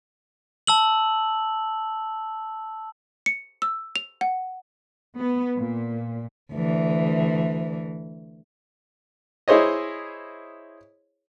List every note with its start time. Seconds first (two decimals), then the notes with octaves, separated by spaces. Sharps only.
0.67 A5 E6 F#7
3.26 C#7
3.62 E6
3.96 F7
4.21 F#5
5.18 B3
5.59 A#2
6.53 D2 E3
9.48 E4 G#4 C5 C#5 D#5